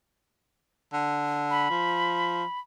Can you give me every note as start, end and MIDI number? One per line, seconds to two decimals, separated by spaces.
0.93 1.66 50
1.51 2.60 83
1.70 2.44 53